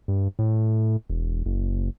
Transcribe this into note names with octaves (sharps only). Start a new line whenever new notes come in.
G2
A2
E1
F#1